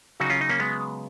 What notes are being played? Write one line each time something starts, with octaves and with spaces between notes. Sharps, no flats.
C#3 F#3 D#4 F#4
C#4 F4
D#4
A#3 C#4
G#3 B3